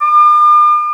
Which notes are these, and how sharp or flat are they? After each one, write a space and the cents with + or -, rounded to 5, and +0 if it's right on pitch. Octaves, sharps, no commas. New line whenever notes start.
D6 +45